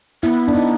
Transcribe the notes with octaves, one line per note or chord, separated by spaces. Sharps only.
B3 E4
D4
D#4